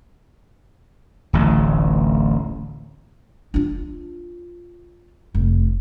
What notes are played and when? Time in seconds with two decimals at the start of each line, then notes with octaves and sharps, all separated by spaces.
1.33 D1 A1
3.54 D4 F4
5.35 F1